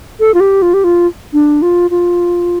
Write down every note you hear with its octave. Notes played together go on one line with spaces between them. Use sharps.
A4
F4
G4
F4
G4
F4
D4
F4
F4